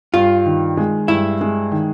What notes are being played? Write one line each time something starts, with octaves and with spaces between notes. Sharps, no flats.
G2 F4
D#3
G#3
G2 E4
G#3
D#3